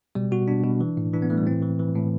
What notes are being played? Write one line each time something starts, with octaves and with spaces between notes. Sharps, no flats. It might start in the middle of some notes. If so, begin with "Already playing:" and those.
B2 G3
B2 F#4
B2 D4
B2
E3
A2
E3 D4
B3
E3 A3
G3
A2 C4
E3
E3
A2